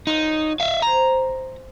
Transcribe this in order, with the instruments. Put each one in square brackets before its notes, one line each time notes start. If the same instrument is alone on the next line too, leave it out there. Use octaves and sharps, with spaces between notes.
[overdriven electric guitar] D#4 [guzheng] F4 F#4 C#5
[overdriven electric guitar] E5 F5
[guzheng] C5 E5 G#5 [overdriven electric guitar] A#5